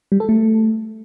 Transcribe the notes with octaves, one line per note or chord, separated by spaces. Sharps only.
G3
A4
A3